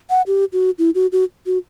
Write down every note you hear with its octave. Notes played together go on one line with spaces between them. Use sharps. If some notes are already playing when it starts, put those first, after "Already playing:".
F#5
G4
F#4
E4
F#4
F#4
F#4